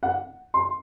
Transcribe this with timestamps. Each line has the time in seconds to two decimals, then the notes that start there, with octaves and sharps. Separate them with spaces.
0.03 F#5
0.54 C6